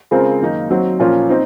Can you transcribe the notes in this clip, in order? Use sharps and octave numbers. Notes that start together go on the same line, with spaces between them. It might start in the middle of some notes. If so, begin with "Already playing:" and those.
C#3 G#3 C4 F4 A#4
F#2 D#3 A#3 D#4
F#3 C4 D#4 F#4
A#2 F3 A#3 C#4 F4
C4 D#4